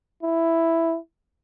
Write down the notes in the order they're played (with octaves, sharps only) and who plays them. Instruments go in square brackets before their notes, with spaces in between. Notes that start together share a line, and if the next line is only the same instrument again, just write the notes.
[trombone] E4